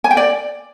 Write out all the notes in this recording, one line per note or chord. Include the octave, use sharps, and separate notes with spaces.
G#5
G5
D5